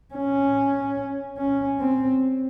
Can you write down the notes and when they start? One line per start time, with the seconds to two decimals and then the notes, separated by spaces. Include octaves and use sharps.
0.14 C#4
1.38 C#4
1.79 C4